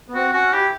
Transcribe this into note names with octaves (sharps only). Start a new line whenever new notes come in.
B3
C4 F#4
C#4 F#4
E4 G4